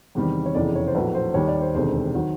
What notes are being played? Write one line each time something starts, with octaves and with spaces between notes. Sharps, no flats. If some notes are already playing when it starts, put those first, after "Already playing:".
E2 C3 D#3 G3
C#5
F1 E2 C#3 E3 D5
C#5
C5
A#1 A2 F#3 B4
C5
D#2 D#3 G3 C#5
D5
C5
E1 D2 C3 D#3 G#3 C5
D#3 F#3